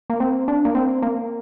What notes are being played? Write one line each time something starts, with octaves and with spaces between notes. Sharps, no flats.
A#3
C4
D4
A#3
C4
A#3